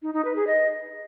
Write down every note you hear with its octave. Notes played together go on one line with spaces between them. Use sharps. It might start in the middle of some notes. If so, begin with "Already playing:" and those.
D#4
D#4
B4
G#4
D#5